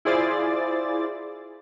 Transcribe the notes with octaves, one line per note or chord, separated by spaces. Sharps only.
E4 F4 G#4 C5 D5 A6